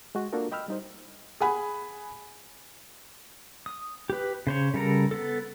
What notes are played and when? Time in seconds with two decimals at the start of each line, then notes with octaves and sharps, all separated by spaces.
0.15 G#3 F#4
0.33 A#3 D4 F4 F#4 A4 A#4
0.52 D#5 G5 B5 E6 F6
0.68 G3 D#4 C5
1.40 G#4 F#5 G#5 B5
3.66 D#6
4.10 G4 B4
4.47 C#3 C5 C#5
4.74 C#3 G3 A4 A#4 A#5
5.11 B3 A4